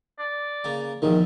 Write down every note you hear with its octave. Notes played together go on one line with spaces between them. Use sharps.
D5
C#3 A#3
A#1 E2 D#3 F3